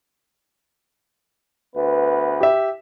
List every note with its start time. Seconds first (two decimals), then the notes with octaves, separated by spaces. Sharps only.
1.74 D2 B3 B4
2.41 G4 E5